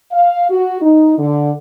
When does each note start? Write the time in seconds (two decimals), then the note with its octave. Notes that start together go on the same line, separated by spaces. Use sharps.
0.12 F5
0.50 F#4
0.81 D#4
1.19 D3